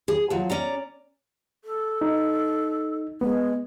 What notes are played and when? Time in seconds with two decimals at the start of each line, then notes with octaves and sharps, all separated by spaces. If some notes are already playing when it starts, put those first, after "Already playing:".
0.08 G#4
0.30 F3 F#3
0.50 C#4 D5 A#5
1.64 A4
2.01 D#4
3.21 G#3 B3